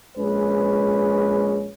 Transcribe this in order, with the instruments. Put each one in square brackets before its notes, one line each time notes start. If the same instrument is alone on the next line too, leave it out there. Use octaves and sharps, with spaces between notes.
[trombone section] A#1 G#3 C#4 B4